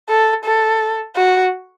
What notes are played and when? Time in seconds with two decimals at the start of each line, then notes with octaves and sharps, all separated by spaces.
0.09 A4
0.45 A4
1.16 F#4